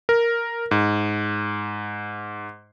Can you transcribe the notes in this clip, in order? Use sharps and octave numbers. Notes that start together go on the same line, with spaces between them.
A#4
G#2